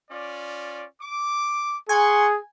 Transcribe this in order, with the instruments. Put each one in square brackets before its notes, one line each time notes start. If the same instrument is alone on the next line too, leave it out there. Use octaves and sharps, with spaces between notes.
[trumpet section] C#4 F4 D5
D6
[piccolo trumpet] G#4 [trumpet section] F#5 C6 C#6 [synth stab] G#5